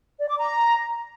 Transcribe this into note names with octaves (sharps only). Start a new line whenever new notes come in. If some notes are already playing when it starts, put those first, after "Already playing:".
D5
D6
A#5